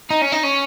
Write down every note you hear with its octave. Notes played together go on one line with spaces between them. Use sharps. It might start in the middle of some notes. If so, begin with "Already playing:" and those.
D#4
C#4
D#4
C#4